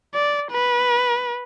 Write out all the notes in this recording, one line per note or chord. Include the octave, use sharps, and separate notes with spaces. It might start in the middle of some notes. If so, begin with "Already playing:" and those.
D5
B4